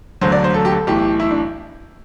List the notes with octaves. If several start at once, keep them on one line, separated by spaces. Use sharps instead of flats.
E1 D2 D3 F#3 C5
D5
C5
A4
G4
A4
B1 A2 E3 G4
E4
D4